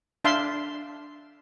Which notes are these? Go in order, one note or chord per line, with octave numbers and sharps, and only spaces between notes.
D4 E5 F5 A5 C6